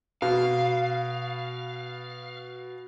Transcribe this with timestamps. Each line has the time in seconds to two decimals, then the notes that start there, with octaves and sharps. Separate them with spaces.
0.22 B2 F5